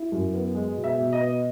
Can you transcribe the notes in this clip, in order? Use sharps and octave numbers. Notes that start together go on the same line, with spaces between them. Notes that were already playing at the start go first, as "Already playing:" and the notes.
Already playing: E4
F#2
B3
G#3
B2
E5
B2
D#5
B3